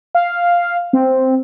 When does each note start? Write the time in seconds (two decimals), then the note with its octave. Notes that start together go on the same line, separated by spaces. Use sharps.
0.15 F5
0.93 C4